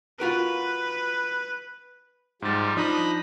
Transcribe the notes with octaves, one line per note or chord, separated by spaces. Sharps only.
F4 F#4 A#4 B4
G#2 F3 G3 A6
F3 D4 D#4 D#5 B5